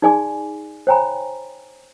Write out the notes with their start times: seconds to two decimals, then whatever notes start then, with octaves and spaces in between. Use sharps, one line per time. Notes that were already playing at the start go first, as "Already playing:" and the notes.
0.02 D#4 G#4 D5 G#5 C6 D6
0.87 C5 C#5 G5 G#5 A#5 B5